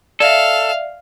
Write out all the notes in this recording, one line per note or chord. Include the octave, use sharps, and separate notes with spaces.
A4 D5 E5 F5